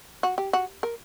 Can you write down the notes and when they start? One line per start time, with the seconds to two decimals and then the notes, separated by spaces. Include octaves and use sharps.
0.23 F#4
0.38 G4
0.53 F#4
0.83 A#4